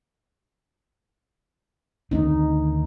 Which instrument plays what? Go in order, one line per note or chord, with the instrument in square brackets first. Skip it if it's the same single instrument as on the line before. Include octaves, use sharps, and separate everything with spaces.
[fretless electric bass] D2 C4 [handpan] D#3 D#4